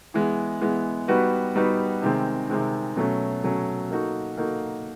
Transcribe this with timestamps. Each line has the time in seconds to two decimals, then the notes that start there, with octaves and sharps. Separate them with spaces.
0.14 E3 G#3 B3
0.61 E3 G#3 B3
1.08 G3 B3 D#4 F#4 B4
1.55 G3 B3 D#4 F#4 B4
2.02 C3 D#3 G#3 C4
2.49 C3 D#3 G#3 C4
2.96 B2 F#3 A3 C#4
3.43 B2 F#3 A3 C#4
3.90 A#3 D#4 F#4 A4
4.37 A#3 D#4 F#4 A4